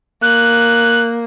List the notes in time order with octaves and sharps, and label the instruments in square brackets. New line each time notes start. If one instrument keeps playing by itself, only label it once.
[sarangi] A#3 [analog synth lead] F#6